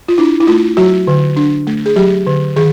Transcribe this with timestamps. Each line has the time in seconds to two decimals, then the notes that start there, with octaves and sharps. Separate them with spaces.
0.08 F4
0.18 D4 E4
0.40 E4
0.47 A3 F4
0.77 F#3 F#4
1.07 D3
1.36 D4
1.67 A3
1.86 G#4
1.96 F#3 G4
2.27 D3
2.56 D#3 G#4